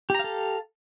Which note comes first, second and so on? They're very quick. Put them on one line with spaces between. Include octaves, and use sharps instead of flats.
G4 A#5 F5 A4